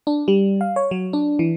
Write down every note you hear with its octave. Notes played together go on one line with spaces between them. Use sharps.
D4
G3
F5
C#5
F#3
D4
E3